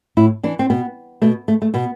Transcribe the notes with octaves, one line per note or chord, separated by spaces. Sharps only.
A2 E4
E3 D4
C4
B2 B3
B2 A3
A3
A3
B2 B3